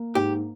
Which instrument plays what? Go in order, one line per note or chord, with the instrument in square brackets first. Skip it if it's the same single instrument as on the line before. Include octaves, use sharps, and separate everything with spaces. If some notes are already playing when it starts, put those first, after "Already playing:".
Already playing: [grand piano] A#3
[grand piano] G#2 [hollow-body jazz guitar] G4